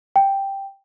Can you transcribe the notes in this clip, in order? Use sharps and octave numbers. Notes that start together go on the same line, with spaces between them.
G5